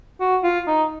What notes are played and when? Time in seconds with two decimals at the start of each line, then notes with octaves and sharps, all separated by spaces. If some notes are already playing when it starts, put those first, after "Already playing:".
0.20 F#4
0.43 F4
0.67 D#4